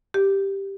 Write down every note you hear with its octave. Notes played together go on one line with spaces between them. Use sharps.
G4